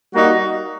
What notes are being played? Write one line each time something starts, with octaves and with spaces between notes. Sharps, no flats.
G3 A#3 D#4 F#4